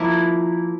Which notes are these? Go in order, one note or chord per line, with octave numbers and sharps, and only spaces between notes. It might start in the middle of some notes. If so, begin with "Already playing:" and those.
Already playing: F3 A#3 E4